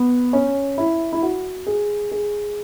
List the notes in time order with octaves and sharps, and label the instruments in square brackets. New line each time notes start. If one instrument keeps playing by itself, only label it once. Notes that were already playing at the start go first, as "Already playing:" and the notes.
Already playing: [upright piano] B3
C#4
E4
E4
F#4
G#4
G#4